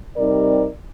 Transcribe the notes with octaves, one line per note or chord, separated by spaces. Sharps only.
C3 G3 C4 D#4 A#4 D5